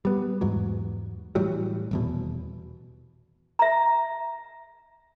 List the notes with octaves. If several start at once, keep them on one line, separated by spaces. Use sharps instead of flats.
G3 B3
E2 G#2 F#3
A2 E3 F#3 G3
D#1 E2 B2
E5 A#5